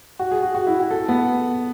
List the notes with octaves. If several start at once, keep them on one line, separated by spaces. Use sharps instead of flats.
F#4
G#4
F#4
F#4
E4
F#4
A4
B3